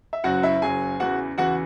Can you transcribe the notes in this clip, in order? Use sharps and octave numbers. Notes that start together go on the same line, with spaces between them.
E5
F#1 F#2 F#3 F#4 F#5
E4 E5
F#1 F#2 F#3 G#4 G#5
E2 C#3 E3 F#4 F#5
E2 C#3 E3 F#4 F#5